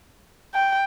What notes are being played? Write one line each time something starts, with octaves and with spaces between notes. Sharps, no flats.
G5